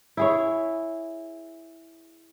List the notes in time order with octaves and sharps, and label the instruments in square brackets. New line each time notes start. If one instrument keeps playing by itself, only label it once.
[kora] E4 G#4 C#5